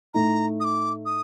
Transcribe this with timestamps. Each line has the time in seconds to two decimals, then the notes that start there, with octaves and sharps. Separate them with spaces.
0.14 A2 A3 D#4 A#5
0.60 D#6
0.65 D6
1.06 D#6